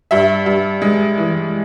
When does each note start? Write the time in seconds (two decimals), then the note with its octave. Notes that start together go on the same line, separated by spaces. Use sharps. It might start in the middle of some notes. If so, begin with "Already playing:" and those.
0.11 G2 E5
0.46 G2
0.82 G#3
1.18 E3